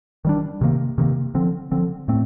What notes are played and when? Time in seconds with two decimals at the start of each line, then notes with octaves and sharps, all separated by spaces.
0.25 D#3 G3 D4
0.61 C3 D#3 A#3
0.98 C3 D#3 A#3
1.35 D3 F3 C4
1.71 D3 F3 C4
2.08 A2 A3 C4